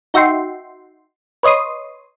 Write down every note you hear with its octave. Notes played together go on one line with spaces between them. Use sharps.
D#4 F#4 E5 G5 C6
B4 C#5 D#5 C6 D#6